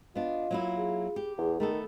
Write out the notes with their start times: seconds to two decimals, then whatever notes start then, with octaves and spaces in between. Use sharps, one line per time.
0.16 B3 D4 F4 D#5
0.51 F#3 A#3 E4
0.77 G#4
1.16 G4
1.38 E2 G#4
1.60 D#3 A3 B3 A4